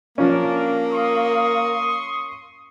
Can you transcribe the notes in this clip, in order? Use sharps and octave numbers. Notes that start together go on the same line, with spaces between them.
F3 A#3 C#4 D4 A#4
C6 C#6 D#6